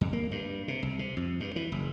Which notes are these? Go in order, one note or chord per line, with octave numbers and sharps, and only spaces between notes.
F2
A#3
G2
C3
C2
C3
F2
G2
E3
F#1